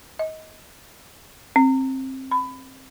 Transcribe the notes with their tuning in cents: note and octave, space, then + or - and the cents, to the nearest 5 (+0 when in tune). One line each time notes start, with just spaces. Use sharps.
D#5 +20
C4 +20
B5 +20